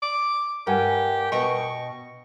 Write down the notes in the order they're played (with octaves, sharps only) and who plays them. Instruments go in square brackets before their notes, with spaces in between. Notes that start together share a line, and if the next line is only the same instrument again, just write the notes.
[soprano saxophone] D6
[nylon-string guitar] G2 [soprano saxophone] G4 [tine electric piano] A#4 F#5 G#5
[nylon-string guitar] B2 D#5 G5 [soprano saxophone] C#6